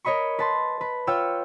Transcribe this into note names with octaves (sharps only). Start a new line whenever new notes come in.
A#4 C#5 D#5 B5 C#6
B4 A5 C6
B4
F4 C#5 F5 G5 E6